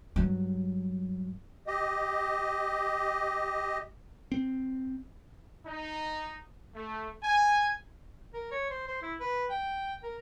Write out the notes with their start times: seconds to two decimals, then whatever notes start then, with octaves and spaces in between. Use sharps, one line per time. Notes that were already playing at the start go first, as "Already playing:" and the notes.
0.16 G2 F#3
1.67 G4 D#5
4.32 C4
5.65 D#4
6.75 A3
7.22 G#5
8.34 A#4
8.52 C#5
8.70 C5
8.88 C5
9.02 E4
9.20 B4
9.50 G5
10.04 A#4